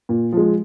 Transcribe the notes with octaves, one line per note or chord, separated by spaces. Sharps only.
A#2
F3 G#3